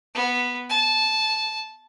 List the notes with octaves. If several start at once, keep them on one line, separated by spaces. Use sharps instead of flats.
B3
A5